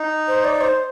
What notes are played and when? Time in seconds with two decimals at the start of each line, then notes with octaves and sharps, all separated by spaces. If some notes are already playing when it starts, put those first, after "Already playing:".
Already playing: D#4
0.28 C5
0.44 D5
0.61 C5